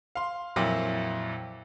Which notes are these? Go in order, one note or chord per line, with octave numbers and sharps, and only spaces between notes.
F5 C6
F2 A#2 F#3 E4